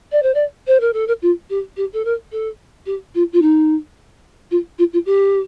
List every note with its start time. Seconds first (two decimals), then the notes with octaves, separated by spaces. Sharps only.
0.12 D5
0.22 C5
0.34 D5
0.67 C5
0.80 A#4
0.93 A4
1.07 A#4
1.22 F4
1.50 G4
1.77 G4
1.93 A4
2.05 A#4
2.32 A4
2.86 G4
3.15 F4
3.33 F4
3.42 D#4
4.51 F4
4.78 F4
4.93 F4
5.06 G4